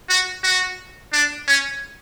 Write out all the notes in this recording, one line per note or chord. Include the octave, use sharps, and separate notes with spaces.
F#4
F#4
D4
C#4